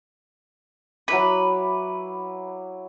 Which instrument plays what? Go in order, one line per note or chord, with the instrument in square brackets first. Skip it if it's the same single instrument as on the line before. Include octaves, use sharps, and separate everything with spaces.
[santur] F#3 E4 D6 [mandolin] B4